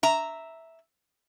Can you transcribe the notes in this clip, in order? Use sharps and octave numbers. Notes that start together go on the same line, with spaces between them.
E5 A#5